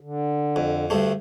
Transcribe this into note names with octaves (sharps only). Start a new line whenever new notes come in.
D3
F2
D2 G2 A3